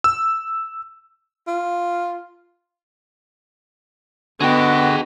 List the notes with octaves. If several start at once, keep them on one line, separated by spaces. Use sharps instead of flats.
E6
F4
D3 B3 F#4 G#4 D#5 G5